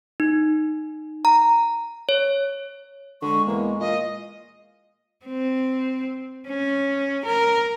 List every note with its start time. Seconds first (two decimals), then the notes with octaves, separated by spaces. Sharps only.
0.20 D#4
1.25 A#5
2.09 C#5
3.22 D3 G#3 C#6
3.47 E2 A#3
3.80 A#2 D#5 F5
5.26 C4
6.48 C#4
7.25 A#4